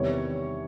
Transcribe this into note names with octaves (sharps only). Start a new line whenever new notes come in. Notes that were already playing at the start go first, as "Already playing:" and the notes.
Already playing: E2 C3 D#3 G3 C#5